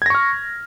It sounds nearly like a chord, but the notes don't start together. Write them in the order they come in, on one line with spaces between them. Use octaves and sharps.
G#6 A#6 C#6 F6